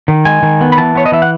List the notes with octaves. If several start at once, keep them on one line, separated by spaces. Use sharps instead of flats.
D#3
G#3 G#5
D#3
B3
B5
E3 A5
B3 C#5
D#5
E3 E5
F#5